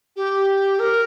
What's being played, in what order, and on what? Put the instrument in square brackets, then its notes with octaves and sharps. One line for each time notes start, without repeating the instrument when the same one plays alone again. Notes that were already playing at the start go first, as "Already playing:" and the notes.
[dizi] G4
A#4